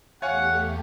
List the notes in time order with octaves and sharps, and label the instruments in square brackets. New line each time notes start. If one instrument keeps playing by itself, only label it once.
[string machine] E2 A3 G4 [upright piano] C#5 F5 G#5 [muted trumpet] F#5